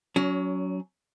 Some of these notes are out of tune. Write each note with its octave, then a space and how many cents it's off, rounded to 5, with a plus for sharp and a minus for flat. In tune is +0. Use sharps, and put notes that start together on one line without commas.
F#3 +5 C#4 +35